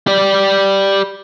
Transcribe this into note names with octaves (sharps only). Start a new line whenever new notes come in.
G4 D5